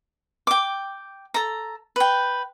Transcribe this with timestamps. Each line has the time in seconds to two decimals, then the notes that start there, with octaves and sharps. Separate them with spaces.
0.47 G5 D6
1.34 A4 A#5
1.96 B4 G5